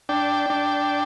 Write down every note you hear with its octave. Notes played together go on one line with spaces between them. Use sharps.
D4 G5
D4